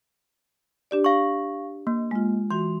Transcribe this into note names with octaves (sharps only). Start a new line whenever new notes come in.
D4 G4 D5
F5 C#6
A#3
G#3 F4
E3 F#4 C6